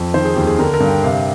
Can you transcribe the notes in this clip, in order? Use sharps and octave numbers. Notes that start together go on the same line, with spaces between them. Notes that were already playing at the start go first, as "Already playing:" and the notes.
Already playing: F2
D#3 C5
G#4
D#2 G4
G#4
D3 A#4
A#4
G2
G5
C3 F5